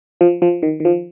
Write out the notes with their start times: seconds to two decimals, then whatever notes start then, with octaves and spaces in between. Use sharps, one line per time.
0.21 F3
0.42 F3
0.63 D#3
0.80 D#3
0.85 F3